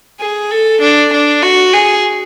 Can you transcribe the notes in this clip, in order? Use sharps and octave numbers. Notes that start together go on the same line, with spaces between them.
G#4
A4
D4
D4
F#4
G#4